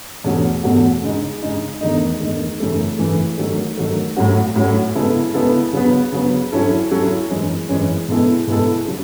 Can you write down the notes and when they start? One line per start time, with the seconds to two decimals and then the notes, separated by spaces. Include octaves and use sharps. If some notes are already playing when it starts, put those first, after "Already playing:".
0.24 E2 B2 A3 C#4 F#4
0.63 E2 B2 A3 C#4 F#4
1.03 C#3 G#3 D#4
1.43 C#3 G#3 D#4
1.81 E2 D#3 A3 D#4
2.20 E2 D#3 A3 D#4
2.60 F#2 C#3 E3 A3
2.98 F#2 C#3 E3 A3
3.38 D#3 F#3 A3
3.78 D#3 F#3 A3
4.16 A2 F#3 C#4 F#4
4.56 A2 F#3 C#4 F#4
4.95 C#3 G#3 B3 E4 A4
5.34 C#3 G#3 B3 E4 A4
5.73 C#3 F#3 B3
6.12 C#3 F#3 B3
6.52 F#3 C#4 E4 A4
6.91 F#3 C#4 E4 A4
7.30 F#2 E3 G#3 C#4
7.69 F#2 E3 G#3 C#4
8.08 B2 G#3 B3 E4 A4
8.47 B2 G#3 B3 E4 A4
8.87 C#3 F#3